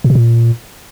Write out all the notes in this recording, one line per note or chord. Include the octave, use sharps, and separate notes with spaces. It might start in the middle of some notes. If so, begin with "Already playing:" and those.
A#2
B2
A#2